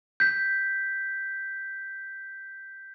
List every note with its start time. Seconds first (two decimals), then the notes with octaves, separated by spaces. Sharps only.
0.20 G6 B6